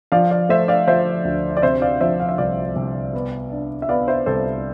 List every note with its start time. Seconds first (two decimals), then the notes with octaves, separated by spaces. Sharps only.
0.12 F3 D5 F5
0.31 D5 F5
0.49 A3 C5 E5
0.68 D5 F5
0.87 F3 C5 E5
1.25 D2
1.57 D5
1.62 C3 C5 E5
1.81 D5 F5
2.01 F3 C5 E5
2.20 F5
2.29 E5
2.38 C2 D5 F5
2.76 C2
3.14 B3
3.51 D4
3.82 E5
3.89 B3 D5 F5
4.08 C5 E5
4.26 C2 A4 C5